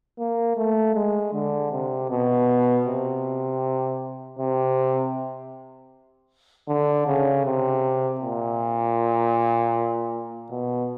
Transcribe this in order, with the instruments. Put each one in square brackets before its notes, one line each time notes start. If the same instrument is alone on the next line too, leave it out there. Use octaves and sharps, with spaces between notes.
[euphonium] A#3
A3
G#3
D3
C3
B2
C3
C3
D3
C#3
C3
A#2
B2